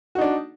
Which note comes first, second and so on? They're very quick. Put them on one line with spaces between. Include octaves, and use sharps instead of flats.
F#4 D#4 D4